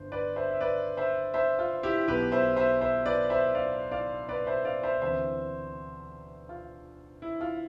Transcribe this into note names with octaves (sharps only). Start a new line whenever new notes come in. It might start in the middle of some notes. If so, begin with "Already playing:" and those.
Already playing: G1 G2 C5
B4 D5
C5 E5
E5
B4 D5
C5 E5
C5 E5
F4
E4 G4
B1 B2 G4 B4
C5 E5
C5 E5
C5 E5
B4 D5
C5 E5
D5 F5
D5 F5
B4 D5
C5 E5
D5 F5
C5 E5
D2 C3 E3 C5 E5
F4
E4
F4